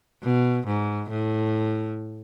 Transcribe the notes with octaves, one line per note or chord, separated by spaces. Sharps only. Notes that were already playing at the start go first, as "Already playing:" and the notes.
B2
G#2
A2